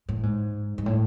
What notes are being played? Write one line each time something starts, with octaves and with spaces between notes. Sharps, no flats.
A2
G#2
G#2
A2